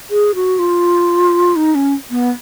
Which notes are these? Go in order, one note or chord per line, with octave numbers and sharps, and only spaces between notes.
G#4
F#4
F4
D#4
C#4
B3